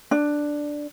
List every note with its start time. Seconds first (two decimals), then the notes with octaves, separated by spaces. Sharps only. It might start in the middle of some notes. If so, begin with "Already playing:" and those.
0.11 D4